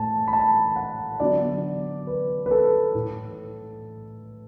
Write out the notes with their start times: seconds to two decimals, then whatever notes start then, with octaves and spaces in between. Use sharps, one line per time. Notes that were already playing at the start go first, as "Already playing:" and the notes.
Already playing: A2 A3 A5
0.28 B5
0.33 A5
0.76 F#5
1.20 D3 F#3 B3 D5
2.07 B4
2.46 B4
2.51 A4
2.95 A2 A3